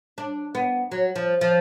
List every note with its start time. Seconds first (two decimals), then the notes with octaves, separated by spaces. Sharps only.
0.18 D4
0.55 B3
0.92 F#3
1.16 F3
1.41 F3